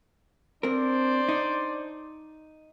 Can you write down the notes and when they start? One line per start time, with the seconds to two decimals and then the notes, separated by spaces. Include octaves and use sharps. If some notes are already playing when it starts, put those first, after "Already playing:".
0.63 C4 D4 A#4 C5 D5
1.29 D#4